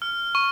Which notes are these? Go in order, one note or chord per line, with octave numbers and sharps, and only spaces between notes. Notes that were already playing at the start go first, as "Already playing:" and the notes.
F6
C#6